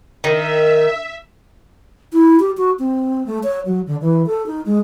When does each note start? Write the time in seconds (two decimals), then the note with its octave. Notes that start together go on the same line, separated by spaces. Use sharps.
0.24 D#3 E5
2.13 E4
2.40 G4
2.57 F#4
2.79 C4
3.26 A3
3.43 C#5
3.65 F#3
3.87 D3
4.01 E3
4.27 A4
4.46 D#4
4.66 G#3